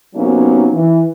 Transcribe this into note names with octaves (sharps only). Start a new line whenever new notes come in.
C3 F#3 A#3 B3 C#4 D#4
E3